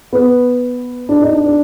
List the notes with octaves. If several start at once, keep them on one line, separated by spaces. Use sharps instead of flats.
B3
D4
D#4
D4
D4